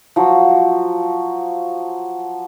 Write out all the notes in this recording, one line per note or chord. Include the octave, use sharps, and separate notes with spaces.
F3 F#3